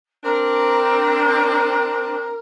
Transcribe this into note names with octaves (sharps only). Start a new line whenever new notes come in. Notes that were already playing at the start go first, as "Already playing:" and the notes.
C4 D4 A#4